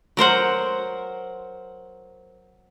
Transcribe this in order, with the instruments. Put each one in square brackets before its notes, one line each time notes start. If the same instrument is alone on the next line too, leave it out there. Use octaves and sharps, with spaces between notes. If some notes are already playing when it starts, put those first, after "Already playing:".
[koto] F#3 A#4 C5 F#5